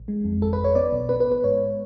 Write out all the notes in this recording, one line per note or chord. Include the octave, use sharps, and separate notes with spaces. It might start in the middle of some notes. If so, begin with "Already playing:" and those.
Already playing: A1
G#3
F2
G#1 A4
B4
G#1
C#5
B3 D5
B1
B3 B4
B4
A1
B4
G#2 C#5